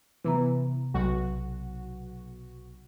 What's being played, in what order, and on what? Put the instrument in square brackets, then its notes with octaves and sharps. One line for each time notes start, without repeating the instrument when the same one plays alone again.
[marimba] C3 B3 A#5 [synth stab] E3
[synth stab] B1 F#4